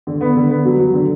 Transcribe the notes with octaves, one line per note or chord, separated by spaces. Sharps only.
D3
B3
D3
B3
F#3
F#3
D3